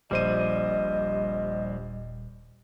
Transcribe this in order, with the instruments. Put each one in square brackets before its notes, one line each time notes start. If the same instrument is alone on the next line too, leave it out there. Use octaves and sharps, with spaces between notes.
[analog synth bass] D#1 [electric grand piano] A#1 C5 D#7 [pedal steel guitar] G3 [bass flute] D#5